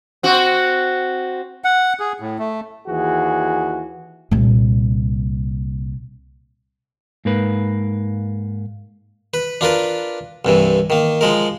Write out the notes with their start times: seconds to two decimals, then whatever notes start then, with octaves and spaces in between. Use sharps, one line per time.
0.23 C4 F#4
1.64 F#5
2.00 G#4
2.20 A2
2.39 A3
2.87 D#2 E3 F#4 G#4
4.31 C2 A#2
7.25 G#2 A#3 B4
9.34 B4
9.61 D4 F4 A#4 B4
10.45 C2 G2 E3
10.90 D#3 A#3
11.21 F3 G#3 A#4